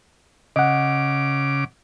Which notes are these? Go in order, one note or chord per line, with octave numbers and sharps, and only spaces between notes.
C#3 D#5 F#5 D6